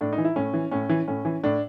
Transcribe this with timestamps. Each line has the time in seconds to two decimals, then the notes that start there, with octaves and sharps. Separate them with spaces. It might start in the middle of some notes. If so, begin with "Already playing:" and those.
0.01 A2 D4
0.13 D#4
0.18 E3
0.25 E4
0.36 A2 C#4
0.54 E3
0.71 A2 C#4
0.89 E3
1.08 A2 C#4
1.25 E3
1.43 A2 D4